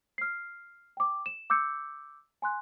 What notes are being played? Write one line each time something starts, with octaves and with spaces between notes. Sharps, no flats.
F6 C7
G5 D6
E7
D6 E6 G6 C#7
G#5 C6 F#6